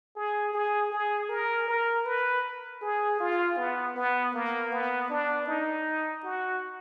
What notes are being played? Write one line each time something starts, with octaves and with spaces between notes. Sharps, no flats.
G#4
G#4
G#4
A#4
A#4
B4
G#4
F4
B3
B3
A#3
B3
D4
D#4
F#4